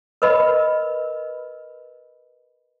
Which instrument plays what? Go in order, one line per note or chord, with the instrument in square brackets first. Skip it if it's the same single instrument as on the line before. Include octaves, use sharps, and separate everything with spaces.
[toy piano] A#4 B4 D#5 B5